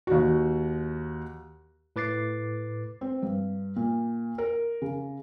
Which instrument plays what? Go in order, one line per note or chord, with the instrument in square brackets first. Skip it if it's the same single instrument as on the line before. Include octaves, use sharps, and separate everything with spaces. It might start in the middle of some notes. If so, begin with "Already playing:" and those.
[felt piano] D#2 F#4
[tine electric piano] A2 B4 D6 A6 C7
[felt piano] C4
G2
A#2
A#4
C#3